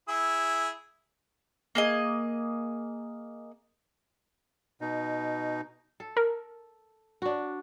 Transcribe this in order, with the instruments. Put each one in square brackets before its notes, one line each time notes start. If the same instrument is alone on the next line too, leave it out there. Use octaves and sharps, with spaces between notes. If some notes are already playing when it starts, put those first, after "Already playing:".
[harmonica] E4 G#4 E6
[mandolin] A#3 G#4 D#5
[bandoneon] B2 D#4
[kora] A4
[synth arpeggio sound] A#4
[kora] D4 F#4